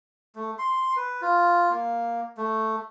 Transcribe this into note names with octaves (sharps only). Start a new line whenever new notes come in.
A3
C6
B4
F4
A#3
A3